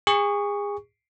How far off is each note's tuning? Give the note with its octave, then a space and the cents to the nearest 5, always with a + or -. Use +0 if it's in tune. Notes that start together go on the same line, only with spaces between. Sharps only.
G#4 -30 C#6 +10